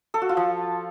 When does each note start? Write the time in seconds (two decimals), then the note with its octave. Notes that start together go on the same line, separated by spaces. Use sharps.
0.14 A4
0.22 F#4
0.29 F4
0.37 F3